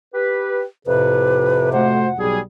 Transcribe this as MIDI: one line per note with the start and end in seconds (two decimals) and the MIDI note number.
0.14 0.62 67
0.14 0.62 71
0.87 2.27 41
0.87 2.27 45
0.87 2.27 48
0.87 1.70 71
1.73 2.09 57
1.73 2.09 66
1.73 2.09 72
1.73 2.18 78
2.18 2.39 35
2.18 2.39 55
2.18 2.39 68